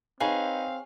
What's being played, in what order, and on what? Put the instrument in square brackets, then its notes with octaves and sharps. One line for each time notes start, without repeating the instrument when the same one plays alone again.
[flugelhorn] C4 [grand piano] D#4 B4 [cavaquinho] G#4 C#5 [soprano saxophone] F5